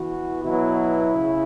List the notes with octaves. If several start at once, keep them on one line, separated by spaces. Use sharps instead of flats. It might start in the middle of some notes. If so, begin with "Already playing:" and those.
Already playing: E3 B3 F#4
B2 F#3 B3 E4
C#3